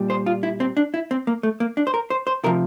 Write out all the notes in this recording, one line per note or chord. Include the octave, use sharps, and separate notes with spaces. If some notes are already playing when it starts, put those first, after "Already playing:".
Already playing: A#2 G3
C5
F4
E4
C4
D4
E4
C4
A#3
A3
A#3
D4
C5
A#4
C5
C5
C3 F3 A#4